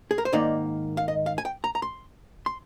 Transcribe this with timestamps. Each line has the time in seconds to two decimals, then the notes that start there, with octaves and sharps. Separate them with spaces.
0.11 G#4
0.18 A#4
0.25 C5
0.33 G#2 D#3 A#3 D#4 D5
0.97 F5
1.08 D#5
1.26 F5
1.38 G#5
1.45 G5
1.64 A#5
1.75 A#5
1.82 C6
2.46 C6